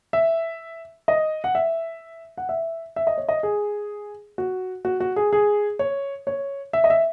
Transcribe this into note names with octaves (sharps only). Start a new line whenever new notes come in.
E5
D#5
F#5
E5
F#5
E5
E5
D#5
C#5
D#5
G#4
F#4
F#4
F#4
G#4
G#4
C#5
C#5
E5
D#5
E5